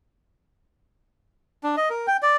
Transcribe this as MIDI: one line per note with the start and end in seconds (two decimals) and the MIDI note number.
1.63 1.76 62
1.77 1.89 75
1.90 2.06 70
2.07 2.17 79
2.22 2.37 74